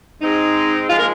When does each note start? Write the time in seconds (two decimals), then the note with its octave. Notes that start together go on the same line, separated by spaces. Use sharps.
0.22 G#2 G#3 C4 D#4
0.89 F3 G#3 F4
0.98 A#3 A#4